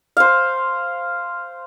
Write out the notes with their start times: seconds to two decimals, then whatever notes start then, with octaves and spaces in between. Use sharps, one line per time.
0.17 C5 F5